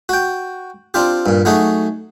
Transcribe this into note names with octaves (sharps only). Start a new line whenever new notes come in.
F#4 G5
C4 D4 F4 G4
G2 A#2
F#3 A3 D#4 F#4 G#4